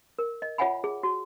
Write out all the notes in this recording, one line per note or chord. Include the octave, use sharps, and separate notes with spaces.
A#4
D#5
F4 C#5 E5 F#5 G#5 B5
G#4
F#4